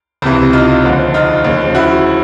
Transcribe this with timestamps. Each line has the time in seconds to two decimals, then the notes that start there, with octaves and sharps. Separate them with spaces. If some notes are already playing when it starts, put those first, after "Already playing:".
0.22 C#2 C3 E3
0.53 D#4 F4
0.83 D#2 D3 F3
1.14 D#4 F4
1.44 D#2 C#3 F3
1.75 E4 F#4